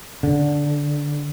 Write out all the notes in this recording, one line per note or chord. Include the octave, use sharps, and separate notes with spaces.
D3